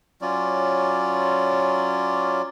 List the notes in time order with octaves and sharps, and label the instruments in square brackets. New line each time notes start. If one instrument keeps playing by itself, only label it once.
[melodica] F#3 C#4 F4 D5